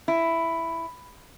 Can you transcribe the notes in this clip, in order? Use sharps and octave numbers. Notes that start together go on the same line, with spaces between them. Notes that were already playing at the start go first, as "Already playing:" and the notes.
E4